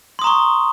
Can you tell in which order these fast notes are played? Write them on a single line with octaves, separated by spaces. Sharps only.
C6 D#6 A#5 C#6